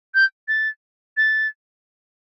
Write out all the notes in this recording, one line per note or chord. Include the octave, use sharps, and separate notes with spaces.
G6
A6
A6